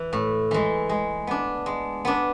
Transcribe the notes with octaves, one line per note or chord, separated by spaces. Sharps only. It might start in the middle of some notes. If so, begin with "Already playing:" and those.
Already playing: E3
A2
E3 G#3
G#3
B3 D4
G#3
B3 D4